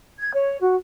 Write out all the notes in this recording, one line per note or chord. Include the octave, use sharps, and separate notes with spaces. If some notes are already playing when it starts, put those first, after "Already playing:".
G#6
C#5
F#4